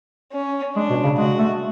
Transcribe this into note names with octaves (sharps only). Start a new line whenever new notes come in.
C#4
G#3 D4
B2
C#3
G#3 F#4
A3